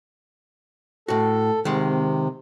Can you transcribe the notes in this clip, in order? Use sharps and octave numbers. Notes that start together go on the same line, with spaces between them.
A2 F#4 A4
C3 D#3 G#3